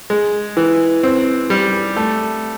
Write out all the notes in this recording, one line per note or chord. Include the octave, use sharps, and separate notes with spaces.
G#3
E3
C4
G3
A3